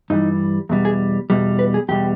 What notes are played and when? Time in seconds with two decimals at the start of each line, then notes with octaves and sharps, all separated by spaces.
0.10 G2 E3 G3 D#4
0.69 E2 B2 G3
0.85 G#4
1.30 E2 B2 G3
1.59 B4
1.74 G#4
1.88 E2 B2 G3 G4